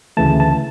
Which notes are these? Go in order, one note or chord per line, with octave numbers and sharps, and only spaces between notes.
D2 C#3 E3 A3 A5
A5